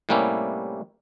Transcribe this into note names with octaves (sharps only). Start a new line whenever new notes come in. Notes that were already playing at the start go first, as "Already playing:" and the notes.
A2 C3 G3 A#3 C#4 E4